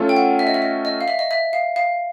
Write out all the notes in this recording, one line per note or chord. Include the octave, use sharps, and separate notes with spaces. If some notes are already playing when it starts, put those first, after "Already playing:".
Already playing: A3 C#4 F4 A4 C#5
G5
F#5
E5
D#5
E5
D#5
D#5
F5
E5
D#5
E5
F5
F5